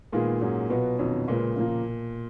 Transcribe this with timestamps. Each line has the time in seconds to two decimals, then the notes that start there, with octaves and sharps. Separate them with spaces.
0.12 A#2 D#3 G#3 B3 F4 G#4
0.41 G#2 F#3 C#4 G#4
0.70 B2 F#3 B3 F4 B4
0.99 F2 D#3 F#3 C#4
1.27 A#2 C#3 G#3 C#4 F4 B4
1.56 C#3 F3 A#3